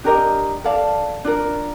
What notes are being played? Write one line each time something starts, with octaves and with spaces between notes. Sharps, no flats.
D4 G4 A#4 D#5
A4 D5 F5 A5
D4 F4 A#4